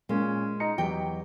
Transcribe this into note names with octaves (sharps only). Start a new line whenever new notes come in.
A#2 G#3 A#3 C#4
D#4 A#5 C#7
E2 F#3 G4 D#5 G5